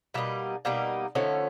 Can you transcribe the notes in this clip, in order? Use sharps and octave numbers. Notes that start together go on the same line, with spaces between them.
B2 G3 A#3 D#4 E4
B2 G3 A#3 D#4
D3 F3 A3 C#4 D#4